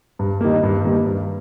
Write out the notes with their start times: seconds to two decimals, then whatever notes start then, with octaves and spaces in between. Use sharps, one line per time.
0.19 G2
0.41 D#3 G3 A#3
0.63 G2
0.84 D#3 G3 A#3
1.06 G2